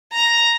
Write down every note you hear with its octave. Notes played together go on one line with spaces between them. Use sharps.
A#5